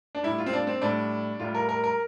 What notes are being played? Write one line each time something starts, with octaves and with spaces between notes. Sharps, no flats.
D4
A2 G3 E4
F4
C4
D4
C4
A2 G3 D4
A2 G3 F4
A#4
A#4
A#4